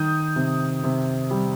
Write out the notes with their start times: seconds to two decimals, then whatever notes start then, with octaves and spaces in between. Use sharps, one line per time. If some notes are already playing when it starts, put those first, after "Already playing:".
Already playing: D#3 D#6 G6
0.36 C3
0.84 C3
1.31 G3